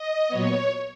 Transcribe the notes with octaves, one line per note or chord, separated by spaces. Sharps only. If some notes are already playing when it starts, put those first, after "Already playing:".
Already playing: D#5
A#2 F#3 B3 C#5